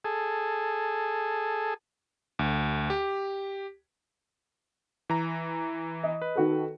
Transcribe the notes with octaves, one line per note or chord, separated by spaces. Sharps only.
G#4 A4
D2
G4
E3 A#5
D#5
B4
D#3 F#4 A4